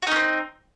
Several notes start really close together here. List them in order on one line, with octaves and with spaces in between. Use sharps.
F#4 D#4 C#4 C4